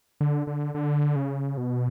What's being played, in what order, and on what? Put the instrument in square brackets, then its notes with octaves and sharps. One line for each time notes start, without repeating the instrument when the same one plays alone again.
[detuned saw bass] D3
D3
D3
C#3
B2